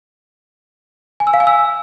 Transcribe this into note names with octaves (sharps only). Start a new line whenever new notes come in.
G#5
E6
F5
G#5
E6